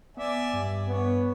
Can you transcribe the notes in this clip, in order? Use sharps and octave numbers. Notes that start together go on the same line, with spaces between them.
B3 D5 E5 G#5
G2
B3 C#5